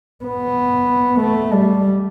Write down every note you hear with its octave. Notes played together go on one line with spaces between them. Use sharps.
B3
A3
G3